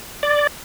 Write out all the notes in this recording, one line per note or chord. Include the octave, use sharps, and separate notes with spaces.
D5